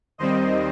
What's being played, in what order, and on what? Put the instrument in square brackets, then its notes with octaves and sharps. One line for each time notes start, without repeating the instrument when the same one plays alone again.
[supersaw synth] D#2 D#3 G3 C4 C5 D#5